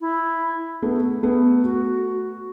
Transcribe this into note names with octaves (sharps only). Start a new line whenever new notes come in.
E4
A3 B3
A3 B3
F#4